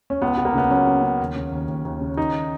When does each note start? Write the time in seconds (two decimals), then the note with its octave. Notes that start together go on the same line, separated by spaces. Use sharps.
0.10 C#4
0.22 C#2 B3
0.37 C#2
0.45 A#3
0.54 C#3 B3
0.70 F#3 C#4
0.86 C#3
1.03 C#3
1.20 D#2
1.36 C#3
1.52 D#2
1.68 D#2
1.85 D#2
2.01 C#3
2.17 D#3 D#4